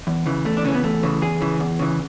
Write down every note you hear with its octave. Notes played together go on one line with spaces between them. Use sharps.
E2
C#3 E3
E2 A3
D4
C#3 E3 C#4
B3
E2 A3
C#3 E3
E2 G#4
C#3 E3
E2
C#3 E3